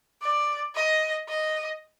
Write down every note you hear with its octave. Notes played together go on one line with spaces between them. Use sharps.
D5
D#5
D#5